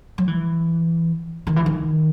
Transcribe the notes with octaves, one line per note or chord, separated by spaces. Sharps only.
F#3
E3
D#3
E3
D#3